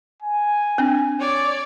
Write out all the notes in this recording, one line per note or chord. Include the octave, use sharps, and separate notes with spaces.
G#5
C4 D4
C#5 D5